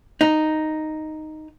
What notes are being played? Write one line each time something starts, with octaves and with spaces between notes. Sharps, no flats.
D#4